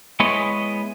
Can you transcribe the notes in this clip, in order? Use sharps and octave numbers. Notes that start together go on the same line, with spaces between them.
G#3 B3 E4 C#5 D#5